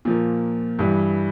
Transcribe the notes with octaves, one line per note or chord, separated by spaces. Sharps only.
A#2 F3 A#3
G2 E3 G3